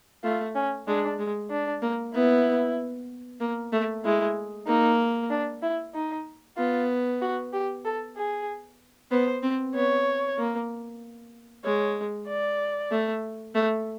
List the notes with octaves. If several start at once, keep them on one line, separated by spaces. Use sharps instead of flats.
A3 F4
C#4
G#3 D4
G#3
D4
A#3
B3 E4
A#3
A3
G#3 E4
A#3 D#4
D4
E4
D#4
B3 F4
F#4
G4
A4
G#4
B3 C5
C4
B3 C#5
A#3
G#3 C#5
D5
A3
A3